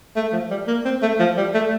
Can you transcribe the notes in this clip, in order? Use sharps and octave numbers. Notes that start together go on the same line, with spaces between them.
A3
F3
G3
A#3
C4
A3
F3
G3
A3